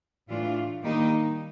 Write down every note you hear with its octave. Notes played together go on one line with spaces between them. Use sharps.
A2 E3 A3 D4 F4
D#3 G3 A#3 D#4 G4